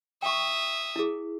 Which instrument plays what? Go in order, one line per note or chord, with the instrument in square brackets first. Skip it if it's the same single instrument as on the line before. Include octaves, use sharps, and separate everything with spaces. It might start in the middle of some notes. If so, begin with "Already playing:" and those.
[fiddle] E5 D#6 [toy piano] G5 C#6
[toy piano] E4 G#4